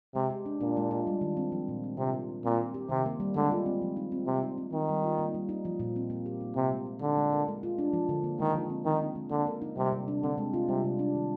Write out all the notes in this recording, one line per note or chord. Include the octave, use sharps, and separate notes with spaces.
C3 G#3
G4
D4
A#2 D4
G#3
F4
G3
D#3
C4
F3
A#2
C4
C3 C4
A#4
D#4
A#2 C4
A#4
G4
C3 D#3
A#3
G3
D3 G#3
F4
C4
F3
D#4
C4
C3 F3
D#4
C4
D#3 C4
G3
F4
A#3
G3
D#4
F3
A#2
C4
A#3
G4
D#4
C3 C4
G#3
G4
D3 D#4
G#3
A#4
G#3
F4
D4
F3
D3
A#3
D#3 G#3
F3
C4
D#3 F3
C4
G#3
D3 A#3
A#4
D#4
C3 G3
C3
D4
D3 C4
G#3
F4
C3 G3
C3
D4
D#3